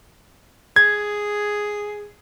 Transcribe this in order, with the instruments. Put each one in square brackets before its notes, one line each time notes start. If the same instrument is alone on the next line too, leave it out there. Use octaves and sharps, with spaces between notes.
[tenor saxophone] G#4 [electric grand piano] G#6